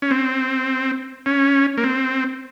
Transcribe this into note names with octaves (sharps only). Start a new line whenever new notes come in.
C#4
C4
C#4
A#3
C4